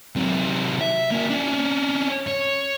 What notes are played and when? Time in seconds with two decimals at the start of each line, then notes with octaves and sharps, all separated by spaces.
0.16 C3 F#3
0.81 E5
1.12 A#3 F#4
1.30 C#4 D4
2.28 C#5